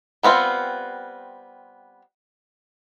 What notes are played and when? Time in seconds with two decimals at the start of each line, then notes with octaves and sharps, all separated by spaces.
0.23 G3 B3 C4 F4